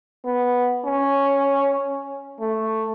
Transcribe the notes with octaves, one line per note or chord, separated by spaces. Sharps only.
B3
C#4
A3